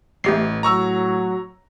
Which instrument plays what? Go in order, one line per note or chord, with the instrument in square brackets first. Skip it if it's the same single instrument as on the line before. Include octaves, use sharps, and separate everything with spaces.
[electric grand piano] A1 [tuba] A2 [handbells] A3 G4 C7
[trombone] F#3 [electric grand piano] A#5 C#6 E6